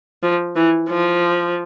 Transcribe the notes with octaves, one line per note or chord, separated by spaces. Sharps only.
F3
E3
F3